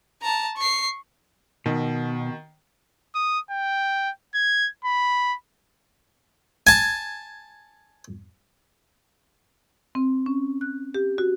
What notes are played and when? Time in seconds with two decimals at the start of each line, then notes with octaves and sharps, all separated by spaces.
0.22 A5 A#5
0.57 C#6 C7
1.66 B2 D#3
3.15 D#6
3.51 G5
4.35 G#6
4.85 B5
6.67 G#5 A5
9.95 C4
10.26 C#4
10.61 F#6
10.94 G4
11.18 F#4